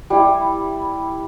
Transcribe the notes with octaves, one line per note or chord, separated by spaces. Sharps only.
G3 E4